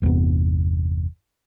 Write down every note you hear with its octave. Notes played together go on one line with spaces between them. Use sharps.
G1 E2 C3 B3